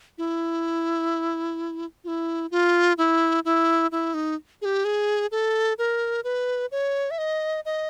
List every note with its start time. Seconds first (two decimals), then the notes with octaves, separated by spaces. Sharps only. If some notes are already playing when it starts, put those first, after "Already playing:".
0.18 E4
2.04 F4
2.08 E4
2.51 F4
2.98 E4
3.45 E4
3.92 E4
4.14 D#4
4.62 G#4
4.65 G4
4.85 G#4
5.31 A4
5.78 A#4
6.24 B4
6.72 C#5
7.11 E5
7.18 D#5
7.65 D#5